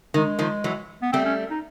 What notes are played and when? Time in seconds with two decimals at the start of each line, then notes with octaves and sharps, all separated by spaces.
0.14 D#3 G#3
0.39 D#3 F3
0.64 E3 F#3
1.02 B3
1.12 G3 A3 C4
1.25 C#4
1.50 D#4